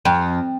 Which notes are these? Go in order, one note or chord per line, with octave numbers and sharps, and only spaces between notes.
F2